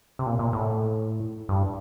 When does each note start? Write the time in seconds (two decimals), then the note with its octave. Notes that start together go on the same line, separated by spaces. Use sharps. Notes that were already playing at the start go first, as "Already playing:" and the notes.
0.19 C3
0.26 A#2
0.39 A#2
0.53 A2
1.49 G2